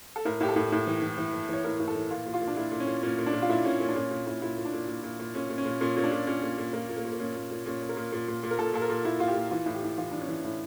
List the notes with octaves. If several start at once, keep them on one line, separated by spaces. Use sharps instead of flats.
A4
A2 A#4
A2 G4
A4
A2
A2
E3
E3
E3
E3
E3 C#5
A2 A#4
A2
A4
E3
A#2 F4
A#2
F4
A#2
D4
A#2 E4
A#2
C#4
A#2
A#2 C#4
A#2
D4
A#2
F4
A#2 E4
A#2 C#4
A#2 C#4
D4
A#2 C#4
A#2
A#2 E4
A#2 E4
A#2
D4
A#2
A#2
A#2
A#2
A#2 C#4
A#2
C#4
A#2
A#2 C#4
A#2 C#4
D4
A#2
A#2 C#4
A#2
A#2
A#2 A#3
A#2
A#3
A#2
A#3
A#2 C#4
A#2
A#2
A#2 C#4
A#2
A#4
A#2
A#2
A#2
A#2
A#4
A#2 A4
A#2 A4
A#4
A#2
A#2 E4
A#2 F4
G4
A#2
E3 F4
A2
G4
A2
E3 F4
E3 D4
C#4
E3
A2